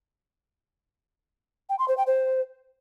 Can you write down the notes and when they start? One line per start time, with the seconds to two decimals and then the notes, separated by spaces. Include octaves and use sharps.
1.69 G5
1.79 C6
1.88 C5
1.97 G5
2.07 C5